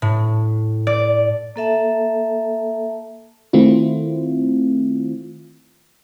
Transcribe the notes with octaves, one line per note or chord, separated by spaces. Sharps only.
A2
D5
A#3 A4 E5 A5
D#3 A3 C4 E4 F4